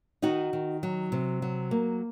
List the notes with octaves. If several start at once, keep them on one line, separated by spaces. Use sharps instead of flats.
D#3 D#4 F#4
D#3
F#3
C3
F#3
A#3